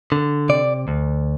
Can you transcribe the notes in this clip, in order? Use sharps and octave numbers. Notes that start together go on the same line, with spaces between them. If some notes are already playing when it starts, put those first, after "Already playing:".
D3
C3 D5
D2